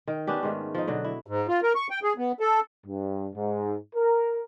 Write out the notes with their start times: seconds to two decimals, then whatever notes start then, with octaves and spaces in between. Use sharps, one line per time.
0.07 D#3 G5
0.27 B3 C#4 D4 G4
0.43 G#2 D#3 A3
0.75 F3 D#4
0.87 B2 D3 F#3
1.04 E4
1.27 G#2
1.48 F4
1.63 A#4
1.75 C#6
1.90 G5
2.03 G#4
2.18 B3
2.40 A4
2.87 G2
3.36 G#2
3.96 A#4